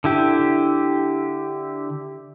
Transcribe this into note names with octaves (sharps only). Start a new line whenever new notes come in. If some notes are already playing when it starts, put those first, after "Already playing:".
D3 E4 G4